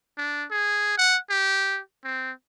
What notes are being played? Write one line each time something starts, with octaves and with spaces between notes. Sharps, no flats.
D4
G#4
F#5
G4
C4